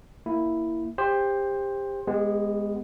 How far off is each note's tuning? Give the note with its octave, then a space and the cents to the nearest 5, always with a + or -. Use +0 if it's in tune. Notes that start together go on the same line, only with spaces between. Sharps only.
A#3 +0 E4 +0
G4 +25 C5 +10
G#3 -5 B3 +0 G4 +35